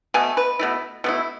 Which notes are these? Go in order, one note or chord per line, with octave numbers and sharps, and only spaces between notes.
B2 A3 G#5
B4
B2 A3 E4
B2 A3 E4